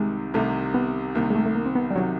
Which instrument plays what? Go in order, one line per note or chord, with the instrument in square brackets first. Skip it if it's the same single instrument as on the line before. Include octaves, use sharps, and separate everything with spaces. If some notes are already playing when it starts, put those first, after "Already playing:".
Already playing: [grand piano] C2 C3 D#3 [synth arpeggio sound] G#3
[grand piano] C2 C3 D#3 [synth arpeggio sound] A3
[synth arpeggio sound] B3
[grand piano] C2 C3 D#3 [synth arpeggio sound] A#3
[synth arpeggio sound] G#3
A3
A3
A#3
C4
B3
G3
[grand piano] C3 D#3 [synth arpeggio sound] F#3